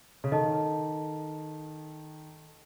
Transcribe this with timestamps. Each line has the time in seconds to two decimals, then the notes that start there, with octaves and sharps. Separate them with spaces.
0.24 C#3
0.31 D#3 A4 D#5 A5